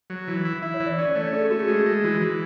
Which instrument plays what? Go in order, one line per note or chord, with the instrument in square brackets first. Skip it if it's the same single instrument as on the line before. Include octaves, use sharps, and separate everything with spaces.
[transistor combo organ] F#3
E3
E4
[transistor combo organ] E4 [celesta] E5
[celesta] C#5
[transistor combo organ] E3
[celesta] D5
[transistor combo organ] C#4 [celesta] D5
[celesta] C#5
[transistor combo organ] A3
[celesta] D5
[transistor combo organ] C#4 [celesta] A4
[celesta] G#4
[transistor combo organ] A3 [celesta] F#4
[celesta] G#4
[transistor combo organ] G#3 [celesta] F#4
[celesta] G#4
[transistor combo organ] G#3
[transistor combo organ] E3 [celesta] F#4
[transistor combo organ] E3